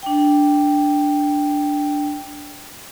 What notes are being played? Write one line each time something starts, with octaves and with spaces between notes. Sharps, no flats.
D4 G5